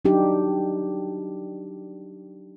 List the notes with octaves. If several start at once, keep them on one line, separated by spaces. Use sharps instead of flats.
F#3 D4 D#4 G4